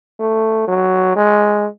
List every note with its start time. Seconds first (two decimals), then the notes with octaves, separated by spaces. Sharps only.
0.20 A3
0.67 F#3
1.16 G#3